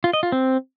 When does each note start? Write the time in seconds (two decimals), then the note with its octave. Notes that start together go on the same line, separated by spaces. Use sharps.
0.04 F4
0.13 D#5
0.23 F4
0.32 C4